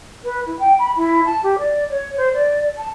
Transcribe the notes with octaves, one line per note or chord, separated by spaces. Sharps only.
B4
E4
G5
B5
E4
A5
G4
D5
C#5
C5
D5
A5